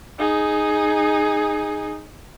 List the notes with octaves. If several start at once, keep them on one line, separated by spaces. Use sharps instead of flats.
D#4 G#4